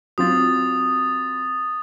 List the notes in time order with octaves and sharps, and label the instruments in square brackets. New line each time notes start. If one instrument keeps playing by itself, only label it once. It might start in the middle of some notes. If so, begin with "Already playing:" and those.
[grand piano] F#3 C4 F4 [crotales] D#6 A6